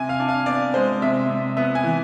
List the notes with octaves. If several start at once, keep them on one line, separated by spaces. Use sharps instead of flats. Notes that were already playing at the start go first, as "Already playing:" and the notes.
Already playing: C3 G#5
F5
D4
F5
B3 D5
G#3 C5
C3 E5
C3
B3 E5
G#5
E3